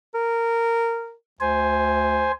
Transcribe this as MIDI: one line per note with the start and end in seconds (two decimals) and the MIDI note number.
0.15 1.14 70
1.40 2.32 38
1.40 2.32 72
1.40 2.32 80